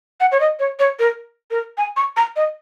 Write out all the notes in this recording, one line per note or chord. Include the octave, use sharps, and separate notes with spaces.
F#5
C#5
D#5
C#5
C#5
A#4
A#4
G#5
C#6
A#5
D#5